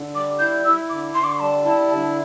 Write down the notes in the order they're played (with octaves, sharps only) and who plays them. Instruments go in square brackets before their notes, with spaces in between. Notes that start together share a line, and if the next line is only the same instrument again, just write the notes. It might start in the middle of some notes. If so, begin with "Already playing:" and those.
Already playing: [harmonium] D3
[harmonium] G3 [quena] D6
[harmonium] E4 [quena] G6
[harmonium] E4 [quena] E6
[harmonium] D3 [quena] D6
[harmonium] D3 [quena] C6
[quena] D6
C6
[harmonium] G3 [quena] A5
[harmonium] E4 [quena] A5
[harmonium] D3 [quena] A5